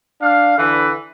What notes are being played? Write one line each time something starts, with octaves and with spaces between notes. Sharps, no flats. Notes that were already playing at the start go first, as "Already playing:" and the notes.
D4 F5
D3 E3 B4